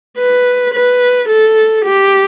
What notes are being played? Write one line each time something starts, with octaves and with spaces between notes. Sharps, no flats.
B4
B4
A4
G4